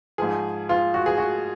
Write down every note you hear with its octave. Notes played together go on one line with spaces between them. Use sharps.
G#2 F3 G#4
F4
F#4
G#4
F#4